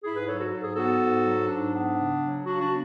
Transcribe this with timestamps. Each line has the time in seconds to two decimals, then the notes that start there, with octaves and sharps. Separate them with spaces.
0.04 G#2 E4 G#4
0.16 G#4 B4
0.28 F#3 A4 C#5
0.40 F#4 A4
0.52 G#2 A4
0.64 G#4
0.76 B3 F#4 A4
1.00 G#2
1.25 F#3
1.48 G#2 D4
1.72 B3
1.97 C#3
2.21 F#3
2.45 C#3 D4 F#4
2.61 D4 F#4
2.69 B3